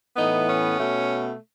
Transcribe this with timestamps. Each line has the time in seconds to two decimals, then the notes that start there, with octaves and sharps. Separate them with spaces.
0.17 A2 E3 B3 D#4
0.47 C#4
0.78 B2 A3